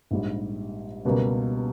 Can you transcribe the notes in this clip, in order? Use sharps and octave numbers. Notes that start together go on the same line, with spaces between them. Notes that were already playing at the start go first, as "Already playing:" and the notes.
A#1 G#2 G3
C#2 B2 G3 A#3